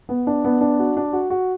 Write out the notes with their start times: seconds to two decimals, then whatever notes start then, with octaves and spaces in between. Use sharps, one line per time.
0.09 B3
0.27 D4
0.44 B3
0.61 D4
0.79 F#4
0.97 D4
1.13 F#4
1.30 F#4